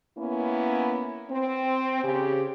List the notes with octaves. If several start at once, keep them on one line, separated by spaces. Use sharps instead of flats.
A#3 B3 C#4 E4
C4
C#3 G4